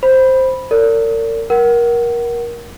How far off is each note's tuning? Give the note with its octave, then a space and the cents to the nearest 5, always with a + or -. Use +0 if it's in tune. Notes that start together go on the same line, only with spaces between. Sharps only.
C5 +0 B5 -5
A#4 -40 D5 -40
A#4 +20 F#5 +25